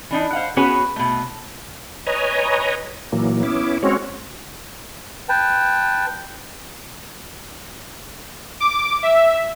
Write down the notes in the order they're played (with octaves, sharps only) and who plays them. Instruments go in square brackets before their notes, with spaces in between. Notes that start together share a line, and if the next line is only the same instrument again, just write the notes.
[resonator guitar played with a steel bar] E3 D4 D#4
C5 F5 F#5
B3 C#4 F#4 G#4 B4 C#5
B2 A3
[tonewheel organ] B4 C#5 D#5 G#5 A#5
A#2 E3 F#3 A#3
B3 C#4 E4 D6
G#3 C4 C#4 F#4 C#5
[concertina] B4 G5 A5
[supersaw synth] D6
E5